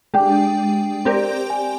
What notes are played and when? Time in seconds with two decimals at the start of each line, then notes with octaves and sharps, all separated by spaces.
0.14 G#3 D4 G4 G5
1.05 C4 G4 A#4 D5
1.50 G#5